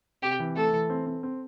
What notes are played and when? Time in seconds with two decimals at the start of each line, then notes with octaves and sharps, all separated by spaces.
0.22 C3 G4
0.40 E3
0.56 A3 A4
0.73 E3
0.90 C4
1.07 C4
1.23 C4